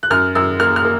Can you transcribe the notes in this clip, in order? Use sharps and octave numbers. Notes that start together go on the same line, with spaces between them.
F#6
F#2 F6
F#2 E6
A#3 F6
F6
A#3